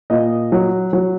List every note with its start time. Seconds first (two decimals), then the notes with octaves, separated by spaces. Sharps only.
0.10 A#2 D#5
0.52 F#3
0.93 F#3